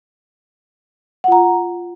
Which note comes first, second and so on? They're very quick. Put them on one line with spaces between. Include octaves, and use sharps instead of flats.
F#5 F4 A#5